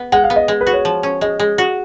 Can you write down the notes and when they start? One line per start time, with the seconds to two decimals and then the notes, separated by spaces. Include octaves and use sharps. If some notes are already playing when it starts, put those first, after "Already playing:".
Already playing: B3
0.12 G#3 F#5
0.24 F5
0.30 B3
0.36 D#5
0.48 G#3
0.61 B4
0.67 F#4
0.73 C#5
0.85 F3
1.03 C#4
1.21 G#3 D#5
1.40 G#3
1.58 F#4